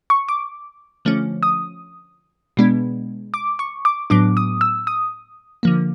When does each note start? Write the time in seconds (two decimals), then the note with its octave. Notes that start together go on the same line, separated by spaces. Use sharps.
0.10 C#6
0.28 D6
1.05 D3 F3 A3 C#4
1.43 D#6
2.57 B2 G#3 B3 D4
3.34 D6
3.59 C#6
3.85 D6
4.10 A2 F#3 B3 D4 D6
4.37 D#6
4.61 E6
4.87 D#6
5.63 D3 F3 A#3